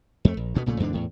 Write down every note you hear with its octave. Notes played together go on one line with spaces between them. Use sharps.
F2 A3
A#1
D2 B2 B3
A#1 A#2 C#3 A3
E2 G#2 D3 D4
E2 A2